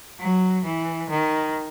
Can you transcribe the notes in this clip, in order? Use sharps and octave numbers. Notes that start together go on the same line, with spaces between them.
F#3
E3
D#3